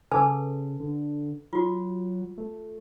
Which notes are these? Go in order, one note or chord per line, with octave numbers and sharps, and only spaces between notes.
C#3 A4 B4 G#5 A5 D6 E6
D3
F#3 F4 F#4
A3